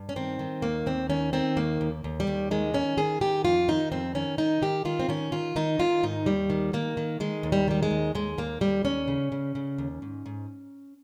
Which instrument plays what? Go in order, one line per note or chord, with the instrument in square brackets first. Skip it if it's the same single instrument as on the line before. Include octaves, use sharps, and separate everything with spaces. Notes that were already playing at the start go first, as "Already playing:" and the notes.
Already playing: [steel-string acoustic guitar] G2
C#4
D#3 C4
D#3
D#2 A#3
D#2 C4
D#3 C#4
D#3 C4
D#2 A#3
D#2
D#2
G3
D#2
D#3 G#3
D#3 C#4
D#3 G#4
D#3 G4
F2 F4
D#3 D#4
F2 C4
D#3 C#4
D#3 D#4
D#3 G4
D#3 F4
C4
D#3 C#4
D#3 F4
D#3 D#4
D#3 F4
G#2 D#4
D#2 G3
D#3
D#3 A#3
D#3
D#3 G#3
D#2
G3
D#3 G3
G#3
D#2
D#2 G#3
D#2 A#3
D#2 G3
D#2 C#4
C#3
C#3
C#3
D#2
G#2
G#2